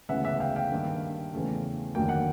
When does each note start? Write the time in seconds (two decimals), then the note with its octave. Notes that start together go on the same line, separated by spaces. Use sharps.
0.09 D2 C#3 E3 G#3 B3 E5 F#5
0.25 E5 F#5
0.40 F5 G5
0.56 F5 G5
0.71 G2 D#3 G3 A#3
1.34 E2 C#3 E3 A3
1.95 F1 D#2 D3 F#3 A#3 G5
2.09 F#5